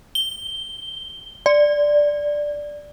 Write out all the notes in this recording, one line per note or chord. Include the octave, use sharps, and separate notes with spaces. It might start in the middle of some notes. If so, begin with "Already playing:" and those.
G7
D5